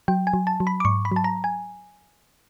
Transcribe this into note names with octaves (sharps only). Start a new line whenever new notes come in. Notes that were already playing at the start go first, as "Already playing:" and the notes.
F#3 G5
G#5
F#3
A5
F#3
B5
D6
G#2 C#6
B5
F#3 A5
A#5
G#5